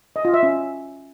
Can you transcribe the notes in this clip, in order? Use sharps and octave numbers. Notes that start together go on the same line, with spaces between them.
D#5
F4
E5
C#4